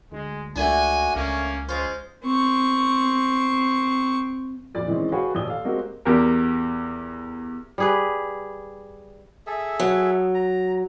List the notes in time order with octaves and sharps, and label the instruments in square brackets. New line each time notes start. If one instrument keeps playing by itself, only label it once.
[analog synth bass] D2 [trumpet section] G#3
[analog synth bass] C#2 [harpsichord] A3 D4 [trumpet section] F#4 G#5
[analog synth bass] C#2 [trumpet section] A#3 C#4
[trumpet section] G#3 C#4 F4 [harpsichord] C5
[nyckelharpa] C4 C#6
[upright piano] F1 A#2 D5 A6
D#3 E3 G#3 C4 C#4
F#4 G#4 B4 C#5 F5 G5
D#2 A#2 D5 D#6 E6 G7
A4 F5
G#3 A#3 C4 F#4 G4 A#4
[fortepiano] E2 G4 A#4
[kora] G3 G#4 B4
[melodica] G#4 A4 E5
[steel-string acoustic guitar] F#3
[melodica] A#5